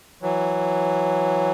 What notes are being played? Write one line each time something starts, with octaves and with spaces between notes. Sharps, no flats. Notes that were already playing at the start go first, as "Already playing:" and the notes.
E3 F#3